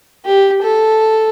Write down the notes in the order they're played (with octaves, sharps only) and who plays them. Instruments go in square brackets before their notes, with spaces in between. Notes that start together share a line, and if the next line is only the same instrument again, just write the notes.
[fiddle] G4
A4